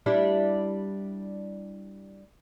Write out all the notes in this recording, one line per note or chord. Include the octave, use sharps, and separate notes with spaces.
G3 D4 E4